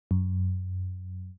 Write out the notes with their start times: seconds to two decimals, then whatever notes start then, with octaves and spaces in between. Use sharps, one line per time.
0.11 F#2